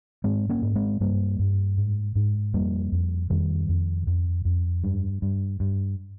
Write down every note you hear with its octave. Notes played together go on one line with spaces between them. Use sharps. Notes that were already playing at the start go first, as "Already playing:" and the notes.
G#2 G#3 C4
A#3 C#4
G#2
G#3 C4
G2 G3 A#3
G2
G#2
G#2
F2 G3 A#3
F2
F2 D#3 G3
F2
F2
F2
G2
G2
G2